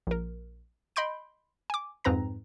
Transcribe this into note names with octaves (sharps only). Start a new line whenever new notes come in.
A#1 A#4
D#5 B5 C6 G6 D7
G#5 D6
F2 G#2 C4 B4 A#5 A#6